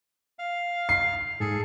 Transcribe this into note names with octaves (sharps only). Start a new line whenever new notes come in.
F5
C7
G#2 G#4 A4